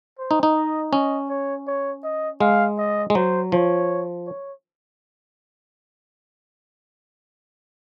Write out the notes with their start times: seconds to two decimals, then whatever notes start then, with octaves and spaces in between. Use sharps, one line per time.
0.18 C5
0.31 D#4
0.43 D#4
0.56 D#5
0.93 C#4 D#5
1.29 C#5
1.67 C#5
2.04 D#5
2.41 G#3 F5
2.78 D#5
3.10 G#3
3.15 F#3 C5
3.52 F3 C#5
4.26 C#5